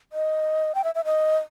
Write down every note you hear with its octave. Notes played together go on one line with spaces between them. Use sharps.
D#5
G5
E5
E5
D#5